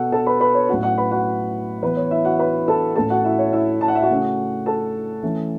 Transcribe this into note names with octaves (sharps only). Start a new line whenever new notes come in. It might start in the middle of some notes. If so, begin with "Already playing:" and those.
Already playing: B2 B3 F#4 A4 F#5
A4 A5
B4 B5
B4 B5
C#5
A2 F#3 C#4 F#4 F#5
F#4 F#5
B4 B5
F#4 F#5
E3 B3 B4
C#5
E4 E5
F#4 F#5
B4 B5
A4 A5
A2 A3 C#4 A4 A5
F#4 F#5
E4 E5
C#5
E4 E5
A5
F#5
E5
F#4 F#5
C#3 A3 C#4
A4 A5
E3 A3 C#4